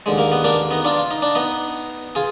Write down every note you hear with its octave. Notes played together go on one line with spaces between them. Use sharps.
D#2 D3 G#3
A#3
B3
A#3 D4
B3 D#4
D4 F4
F4
D#4
D4
B3 D#4
F4 G#4